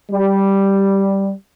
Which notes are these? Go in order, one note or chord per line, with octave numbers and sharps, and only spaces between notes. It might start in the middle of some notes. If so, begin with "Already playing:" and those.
G3